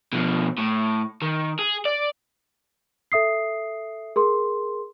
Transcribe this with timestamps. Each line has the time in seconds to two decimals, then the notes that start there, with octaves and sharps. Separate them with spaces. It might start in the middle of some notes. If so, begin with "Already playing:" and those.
0.13 B2 F3
0.58 A2
1.22 D#3
1.59 G#4
1.85 D5
3.12 A4 E5 D#6 C7
4.16 G#4 A#4 C6